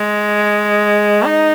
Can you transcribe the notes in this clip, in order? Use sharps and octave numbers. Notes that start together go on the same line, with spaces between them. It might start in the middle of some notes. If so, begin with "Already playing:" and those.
Already playing: G#3
D#4